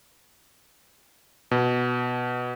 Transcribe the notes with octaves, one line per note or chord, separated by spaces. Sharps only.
B2